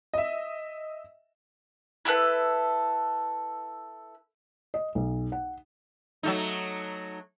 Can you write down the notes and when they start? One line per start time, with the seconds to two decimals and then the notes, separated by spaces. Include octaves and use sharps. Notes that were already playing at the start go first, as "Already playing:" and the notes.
0.14 D#5 E5
2.05 E4 G4 A4 B4
4.74 D#5
4.95 B1
5.32 F#5
6.23 F#3 A3 D#4